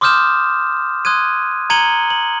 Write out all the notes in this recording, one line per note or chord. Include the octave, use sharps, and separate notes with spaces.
C6 D6 D#6 F6 G6 E7
C6 D#6 F#6 G#6 D#7
A#5 G#6 C#7 D#7 F#7 G7
F#7